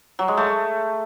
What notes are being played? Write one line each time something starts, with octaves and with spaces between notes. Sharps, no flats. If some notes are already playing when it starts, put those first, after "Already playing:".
F#3
G#3
A3